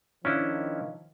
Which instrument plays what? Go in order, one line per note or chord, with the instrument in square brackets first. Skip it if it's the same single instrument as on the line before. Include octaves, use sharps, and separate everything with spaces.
[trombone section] D#3 F3 [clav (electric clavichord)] C#4 D4 E4